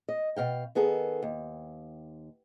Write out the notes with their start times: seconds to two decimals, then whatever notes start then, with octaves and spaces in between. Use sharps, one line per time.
0.09 D#5
0.36 B2 F5 G5
0.75 D#3 B3 G#4 A4
1.23 D#2